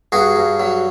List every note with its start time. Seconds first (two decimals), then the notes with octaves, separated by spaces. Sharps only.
0.12 G2 F#4 G#4
0.36 G2
0.60 F#3